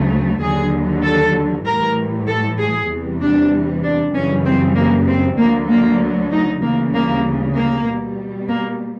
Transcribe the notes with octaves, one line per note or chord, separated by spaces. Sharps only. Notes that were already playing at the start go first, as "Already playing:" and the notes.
Already playing: D2 C#3 F#3 A3
D#2 D3 F#3 G#4
A4
A2 E3 G3 A#4
A4
G#4
E2 C3 E3 G3
D4
D4
F#2 C#3 E3 G3 C#4
C4
A#3
C4
D2 D3 F#3 A#3
A#3
D#4
D2 C#3 E3 G3 A#3
A#3
A#3
B2 G3
A#3